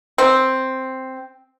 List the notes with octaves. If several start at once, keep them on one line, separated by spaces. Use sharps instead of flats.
C4